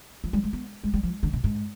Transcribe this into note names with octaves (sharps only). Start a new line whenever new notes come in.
F3
G3
G#3
B3
G#3
G3
F3
D3
B2
G#2